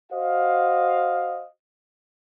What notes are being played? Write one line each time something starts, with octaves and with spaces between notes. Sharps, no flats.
F#4 C5 D#5 F5